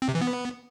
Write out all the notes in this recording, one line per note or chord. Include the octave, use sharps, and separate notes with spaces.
C4
C3
E3
B3